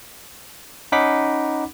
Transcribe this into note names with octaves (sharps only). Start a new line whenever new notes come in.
C#4 D#4 F#5 B5 D6 B6